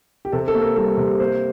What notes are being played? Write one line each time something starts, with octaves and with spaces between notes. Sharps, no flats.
G4
C3 A4
A4
A#3
A#4
G3 A4
C3
A#3 C5